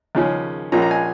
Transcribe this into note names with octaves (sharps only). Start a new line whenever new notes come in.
D#2 C#3 F3 C#4
A#1 A#2 F3 C#4 A#5
A#5
G#5